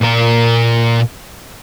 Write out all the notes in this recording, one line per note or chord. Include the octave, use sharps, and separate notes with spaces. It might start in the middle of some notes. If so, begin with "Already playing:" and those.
A#2 A#4